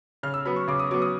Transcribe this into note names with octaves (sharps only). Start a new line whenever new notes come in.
C#3 F6
E6
F#3 B3 B5
C#6
C#3 D6
D#6
F#3 B3 D6
D#6